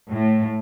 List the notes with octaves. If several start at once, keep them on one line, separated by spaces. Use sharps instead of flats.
A2